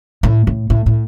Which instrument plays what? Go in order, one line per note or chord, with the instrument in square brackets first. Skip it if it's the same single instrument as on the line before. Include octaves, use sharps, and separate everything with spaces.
[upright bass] A2
A2
A2
A2